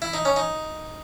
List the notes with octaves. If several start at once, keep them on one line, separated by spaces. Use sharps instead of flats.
E4
D#4
C#4
D#4